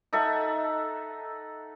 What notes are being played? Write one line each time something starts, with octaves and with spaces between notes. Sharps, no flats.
D#4 A4 E5 F#5